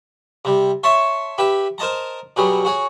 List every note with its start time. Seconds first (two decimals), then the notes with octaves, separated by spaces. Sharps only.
0.45 C3 G3
0.83 C#5 E5 A5 C6 C#6
1.38 G4 B4 E5
1.78 A#4 C5 D#5 A5 A#5
2.36 B2 F#3 G3 G#4
2.65 F#4 G#4 C#5